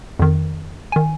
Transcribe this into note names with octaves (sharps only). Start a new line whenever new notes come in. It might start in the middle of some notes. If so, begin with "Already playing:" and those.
F2 D#3
D#3 G#5